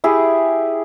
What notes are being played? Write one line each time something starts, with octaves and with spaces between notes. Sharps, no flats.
E4 G4 G#4